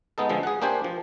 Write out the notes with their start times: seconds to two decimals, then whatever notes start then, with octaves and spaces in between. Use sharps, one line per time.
0.18 G#3 B3 D#4 A4
0.29 D3 F3 G#3
0.43 G#4 F#5
0.62 A#3 D4 G4 C5 G#5
0.84 F3